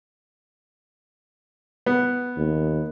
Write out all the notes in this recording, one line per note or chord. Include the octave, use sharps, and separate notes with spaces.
B3
D#2